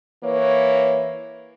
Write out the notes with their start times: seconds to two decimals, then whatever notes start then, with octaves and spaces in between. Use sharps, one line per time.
0.24 E3 A#3 B4 C#5